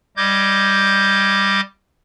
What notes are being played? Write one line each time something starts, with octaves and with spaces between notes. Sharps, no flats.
G3 D#5 D6 G6 G#6